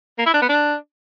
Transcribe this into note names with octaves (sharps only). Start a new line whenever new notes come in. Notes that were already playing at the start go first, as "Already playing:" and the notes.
A#3
E4
D4
B3
D4